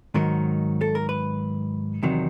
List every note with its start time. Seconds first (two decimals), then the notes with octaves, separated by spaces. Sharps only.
0.14 G#2 D#3 F#3 A#4
0.81 A4
0.95 A#4
1.09 B4
2.03 E2 C3 D#3 F#3